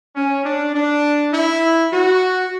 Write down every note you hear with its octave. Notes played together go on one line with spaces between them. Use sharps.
C#4
D4
D4
E4
F#4